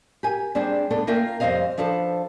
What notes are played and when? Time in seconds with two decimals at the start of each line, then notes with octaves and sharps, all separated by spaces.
0.23 G4 A#4 G#5
0.55 G3 C4 D4 G#4
0.90 A3 B3 D4 A4
1.07 A#3 F4 A#4 E5 G5
1.40 F2 G3 A3 C4 D#5 F5
1.78 F3 D4 A4 B4 C5